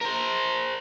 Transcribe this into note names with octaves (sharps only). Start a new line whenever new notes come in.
A#4 C5